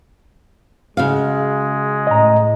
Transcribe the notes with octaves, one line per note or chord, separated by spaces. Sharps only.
C#3 G#3 F#4 F5
A2 D#5 A#5